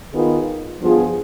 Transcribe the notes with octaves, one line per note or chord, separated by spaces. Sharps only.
D#3 B3 F4 G#4
G2 F3 B3 F4 G#4